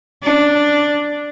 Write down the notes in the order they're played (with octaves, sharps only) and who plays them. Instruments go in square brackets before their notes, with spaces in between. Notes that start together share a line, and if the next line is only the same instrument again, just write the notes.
[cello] D4